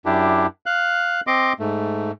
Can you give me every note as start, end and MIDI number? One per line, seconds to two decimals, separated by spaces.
0.06 0.46 42
0.06 0.46 62
0.06 0.46 64
0.06 0.46 67
0.66 1.20 77
0.66 1.20 90
1.27 1.53 60
1.27 1.53 75
1.27 1.53 84
1.27 1.53 86
1.60 2.11 44
1.60 2.11 57